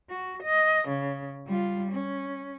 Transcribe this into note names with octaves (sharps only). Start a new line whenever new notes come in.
F#4
D#5
C#3
G3 F4
C#4